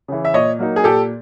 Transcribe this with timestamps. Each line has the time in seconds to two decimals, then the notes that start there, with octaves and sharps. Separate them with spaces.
0.08 C#3 E3
0.25 E5
0.34 A#2 C#5 D#5
0.59 F#3 A#3 D#4
0.76 G#4
0.84 A#2 G4 A4